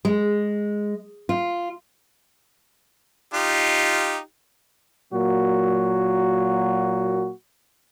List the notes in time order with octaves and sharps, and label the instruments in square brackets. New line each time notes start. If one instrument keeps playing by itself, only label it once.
[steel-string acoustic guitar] G#3
F4
[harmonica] D#4 F4 G4
[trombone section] A#2 F#3 A#3 F#4